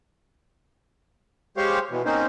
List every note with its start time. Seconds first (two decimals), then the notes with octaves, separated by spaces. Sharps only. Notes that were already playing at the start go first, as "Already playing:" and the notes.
1.57 G#3 G4 C5 C#5 F5
1.91 B2 E3
2.05 A#3 C4 C#4 D#4 C5